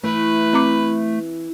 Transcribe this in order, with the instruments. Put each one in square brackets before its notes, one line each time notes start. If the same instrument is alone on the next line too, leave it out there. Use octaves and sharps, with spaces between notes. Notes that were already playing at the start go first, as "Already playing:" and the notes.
[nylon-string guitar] E3 [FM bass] A3 [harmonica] B4
[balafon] C4 A#5 D6